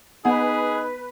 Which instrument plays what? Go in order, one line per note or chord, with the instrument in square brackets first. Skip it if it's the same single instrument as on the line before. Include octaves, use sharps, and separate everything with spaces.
[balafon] B3 F#5 [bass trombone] D#4 [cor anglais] G#4 [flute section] B4